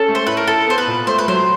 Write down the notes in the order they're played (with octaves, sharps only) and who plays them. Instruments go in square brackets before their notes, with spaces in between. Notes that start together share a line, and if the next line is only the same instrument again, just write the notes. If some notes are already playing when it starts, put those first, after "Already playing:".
Already playing: [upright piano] C#4 [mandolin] A4
[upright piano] A3
[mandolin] C5
[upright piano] A2 [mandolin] B4
[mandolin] A#4
[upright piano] E4 [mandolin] A4
[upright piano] B3 [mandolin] C5
[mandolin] B4
[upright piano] A#2
[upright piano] A3 [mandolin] C5
[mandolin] B4
[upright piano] F#3 [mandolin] C5